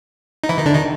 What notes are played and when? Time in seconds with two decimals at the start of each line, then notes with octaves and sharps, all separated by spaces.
0.44 D#4
0.49 E3 E4
0.58 D#3 D#4
0.66 D3 D4
0.74 D#3 D#4